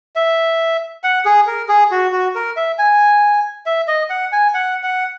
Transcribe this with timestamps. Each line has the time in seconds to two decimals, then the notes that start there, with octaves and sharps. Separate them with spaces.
0.16 E5
1.04 F#5
1.25 G#4
1.47 A#4
1.68 G#4
1.91 F#4
2.12 F#4
2.35 A#4
2.56 E5
2.79 G#5
3.66 E5
3.88 D#5
4.10 F#5
4.32 G#5
4.54 F#5
4.83 F#5